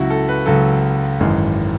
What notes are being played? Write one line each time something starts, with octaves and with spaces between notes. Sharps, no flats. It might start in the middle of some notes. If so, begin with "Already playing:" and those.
Already playing: C#2 C#3 F#3 E4 F#4
A4
B4
C#2 C#3 F#3 A4
G#1 F#2 E3 G#3